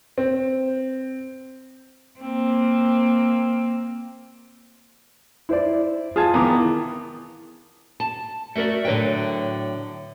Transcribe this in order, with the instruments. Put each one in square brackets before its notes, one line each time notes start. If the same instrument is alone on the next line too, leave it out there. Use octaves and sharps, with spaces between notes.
[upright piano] C4
[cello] A#3 C4
[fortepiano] E4 C5 D5
[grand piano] F4 A5 G#6 [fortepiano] G#4
[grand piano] D#3 E3 B3 [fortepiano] A#5 D6
[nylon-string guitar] A5
A3 F#4 A#4 D5 E5
A2 D3 F#3 B4 G5